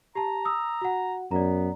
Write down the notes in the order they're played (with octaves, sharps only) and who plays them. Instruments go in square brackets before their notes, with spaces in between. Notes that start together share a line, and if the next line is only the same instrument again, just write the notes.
[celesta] G4 A5 [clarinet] A#5
[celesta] D#6 E6
F#4 F#5
[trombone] F#2 [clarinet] B3 [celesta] D5 A#5